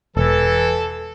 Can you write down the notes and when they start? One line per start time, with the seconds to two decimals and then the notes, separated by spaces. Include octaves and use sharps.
0.17 E1 E3 A4